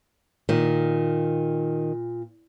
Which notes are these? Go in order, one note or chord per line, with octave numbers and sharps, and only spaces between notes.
A#2 D#3